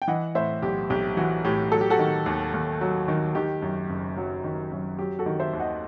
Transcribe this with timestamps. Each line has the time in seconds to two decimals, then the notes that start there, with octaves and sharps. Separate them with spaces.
0.02 G5
0.08 E3 D#5 F#5
0.35 A2 C5 E5
0.62 B1 G4
0.90 B1 G4
1.17 E3 F#4
1.44 A2 G4
1.72 F#3 A4
1.81 G4
1.90 F#4 A4
1.99 D#3
2.26 D#2
2.54 D#2
2.81 F#3
3.08 D#3
3.35 D#3 G4
3.62 F#2
3.90 F#1
4.17 F#3
4.44 D#3
4.72 F#2
4.99 F#3 G4
5.19 F#4 A4
5.26 D#3
5.40 C5 E5
5.53 D#2
5.60 D#5 F#5